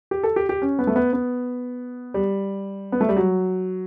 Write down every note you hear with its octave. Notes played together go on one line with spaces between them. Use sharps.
G4
A4
G4
G4
C#4
B3
A3
B3
B3
G3
B3
A3
G3
F#3